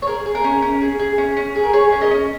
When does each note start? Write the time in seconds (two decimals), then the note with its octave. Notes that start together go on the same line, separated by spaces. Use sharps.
0.02 C#5
0.07 G#4 A#4
0.26 G#4
0.35 A#4
0.44 C#4
0.62 C#4
0.81 G#4
0.99 G#4
1.18 C#4
1.37 C#4
1.55 G#4
1.64 A#4
1.73 G#4 C#5
1.92 C#4
2.01 A#4 D#5
2.11 C#4